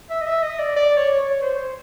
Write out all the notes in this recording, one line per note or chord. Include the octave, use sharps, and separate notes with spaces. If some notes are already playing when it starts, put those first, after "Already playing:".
E5
D#5
E5
D#5
D5
D5
C#5
C#5
C5